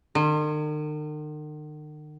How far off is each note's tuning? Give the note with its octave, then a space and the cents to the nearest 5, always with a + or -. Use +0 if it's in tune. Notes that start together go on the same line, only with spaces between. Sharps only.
D#3 -45